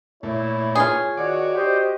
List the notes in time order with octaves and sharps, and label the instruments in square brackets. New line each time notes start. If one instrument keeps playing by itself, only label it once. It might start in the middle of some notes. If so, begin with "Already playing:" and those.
[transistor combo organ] A#2 A3 [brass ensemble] E4 [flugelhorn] C#5
[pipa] F4 G#4
[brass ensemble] D#3 C#5 [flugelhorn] F#4 [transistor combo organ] D5
[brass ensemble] F#4 C5 D#5 [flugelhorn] G4